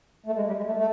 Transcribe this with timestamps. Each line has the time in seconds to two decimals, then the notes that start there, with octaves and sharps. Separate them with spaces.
0.26 A3
0.36 G#3
0.47 G3
0.57 G#3
0.66 A3
0.77 A3